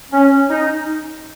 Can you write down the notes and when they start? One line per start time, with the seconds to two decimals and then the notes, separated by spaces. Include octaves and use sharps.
0.12 C#4
0.49 D#4